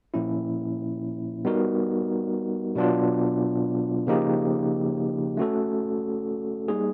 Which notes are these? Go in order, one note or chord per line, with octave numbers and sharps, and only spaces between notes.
A#2 F3 A#3 C#4 E4
G3 B3 D#4 F#4 A#4
B2 F#3 B3 D4 F4
C#3 F3 A#3 D#4 G4
A3 C#4 F#4 A4
G3 A#3 D#4 G#4